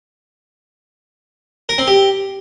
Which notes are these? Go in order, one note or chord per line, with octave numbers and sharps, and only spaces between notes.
A#4
C4
G4